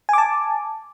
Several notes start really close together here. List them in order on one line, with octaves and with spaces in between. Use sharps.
G#5 D6 A5